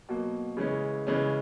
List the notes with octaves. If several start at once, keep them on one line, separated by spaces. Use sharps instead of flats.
B2 F#3 A#3
C#3 E3 G#3 C#4
C#3 E3 G#3 C#4